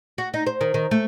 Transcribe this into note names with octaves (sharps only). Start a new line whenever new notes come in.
F#4
D#4
C5
D#3
D#3
A3